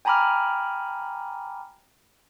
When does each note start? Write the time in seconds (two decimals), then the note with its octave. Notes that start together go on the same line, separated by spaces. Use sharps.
0.05 G5 G#5 A#5 B5 D6 F6